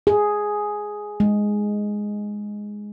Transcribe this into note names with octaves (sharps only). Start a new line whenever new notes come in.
G#4
G#3